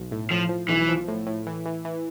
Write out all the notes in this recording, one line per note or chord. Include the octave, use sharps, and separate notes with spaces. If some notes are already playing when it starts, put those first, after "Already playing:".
Already playing: B1
A2
A2 F3
F3
B1 E3
F3
A2
A2
E3
E3
E3